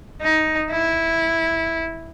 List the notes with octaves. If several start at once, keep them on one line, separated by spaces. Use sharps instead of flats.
D#4
E4